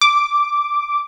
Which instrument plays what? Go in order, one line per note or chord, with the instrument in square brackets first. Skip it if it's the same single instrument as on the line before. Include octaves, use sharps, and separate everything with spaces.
[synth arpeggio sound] D6